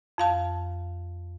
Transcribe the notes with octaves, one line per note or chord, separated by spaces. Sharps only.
F2 F5 A5